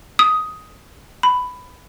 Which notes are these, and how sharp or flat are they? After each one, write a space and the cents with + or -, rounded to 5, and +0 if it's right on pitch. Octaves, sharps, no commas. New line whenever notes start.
D#6 +10
B5 +10